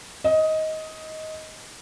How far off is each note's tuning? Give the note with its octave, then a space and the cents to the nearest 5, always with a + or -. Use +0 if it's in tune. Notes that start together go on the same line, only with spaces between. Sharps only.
D#5 +15